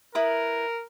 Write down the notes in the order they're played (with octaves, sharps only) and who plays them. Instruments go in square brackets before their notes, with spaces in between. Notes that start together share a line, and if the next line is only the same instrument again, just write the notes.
[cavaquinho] E4 B4 D#6 [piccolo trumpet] A#4